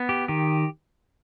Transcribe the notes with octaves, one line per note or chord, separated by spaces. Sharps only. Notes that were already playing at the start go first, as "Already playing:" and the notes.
Already playing: B3
G4
D#3 G4